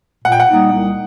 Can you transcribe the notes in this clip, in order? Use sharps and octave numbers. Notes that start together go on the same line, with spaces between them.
A#2 F#5
G5
F#5
G3 A#3 D#4
C2